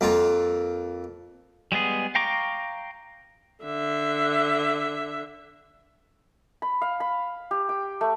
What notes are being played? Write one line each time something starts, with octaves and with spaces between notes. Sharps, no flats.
F2 A#3 F4
G3 G#3 B3 G#4
F5 G5 A#5 C#6 D6
D3 E5
B5
F5
B5
G4
G5
A3